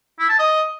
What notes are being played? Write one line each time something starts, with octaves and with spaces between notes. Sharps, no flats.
E4
A5
D#5